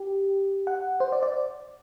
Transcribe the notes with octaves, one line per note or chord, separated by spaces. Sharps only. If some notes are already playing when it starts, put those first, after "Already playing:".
Already playing: G4
F#5
C5
D5
D5